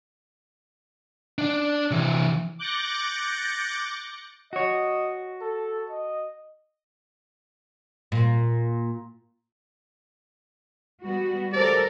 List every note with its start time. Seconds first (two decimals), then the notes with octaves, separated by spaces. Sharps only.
1.38 D4 D5
1.91 C3 E3
2.59 D6 F#6 G6 A6 A#6 C#7
4.53 F#4 C#5 D#5
5.41 A4
5.90 D#5
8.12 A#2
11.03 G3 B3 F#4
11.53 G3 G4 A4 A#4 C5 D5